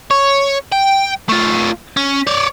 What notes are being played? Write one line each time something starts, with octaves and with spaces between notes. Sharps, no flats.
C#5
G5
A3 F4
C#4
C#5 D5